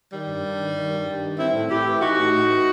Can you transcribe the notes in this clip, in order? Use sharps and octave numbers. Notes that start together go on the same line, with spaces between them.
D#3 G3
G2
G2
D#3
D#3
G2
G2
D#3
E3 C4 E4
A2
A2 E4 G4
E3
E3 D#4 F#4
A2
A2
E3